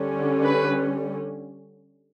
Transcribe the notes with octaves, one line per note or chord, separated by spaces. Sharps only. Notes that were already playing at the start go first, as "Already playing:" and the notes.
Already playing: D3 G3 C#4
B4